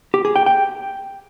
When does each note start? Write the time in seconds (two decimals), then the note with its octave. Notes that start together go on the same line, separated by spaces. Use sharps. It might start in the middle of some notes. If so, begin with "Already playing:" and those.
0.14 G4
0.25 G#4
0.36 G5
0.46 G5